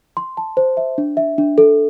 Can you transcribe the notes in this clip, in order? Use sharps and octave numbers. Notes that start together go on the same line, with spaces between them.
C6
A5
C5
E5
D4
E5
D4
A4